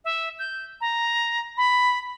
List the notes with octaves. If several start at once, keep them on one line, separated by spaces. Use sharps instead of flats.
E5
G6
A#5
B5